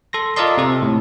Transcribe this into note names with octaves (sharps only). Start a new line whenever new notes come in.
A4 C6 A#6
F4 A4 A#4 D5 D#5 C6
C3 A4
A2